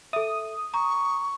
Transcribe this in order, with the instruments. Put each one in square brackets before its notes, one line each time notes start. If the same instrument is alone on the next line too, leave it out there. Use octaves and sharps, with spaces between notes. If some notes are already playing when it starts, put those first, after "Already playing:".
[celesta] A4 E5 [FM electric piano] D#6
[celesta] A#5 [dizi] C#6